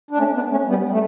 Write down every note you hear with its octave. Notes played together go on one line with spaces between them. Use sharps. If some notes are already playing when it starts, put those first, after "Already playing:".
D4
A3 C#4
B3 D4
A3 C#4
G3 B3
G3
A3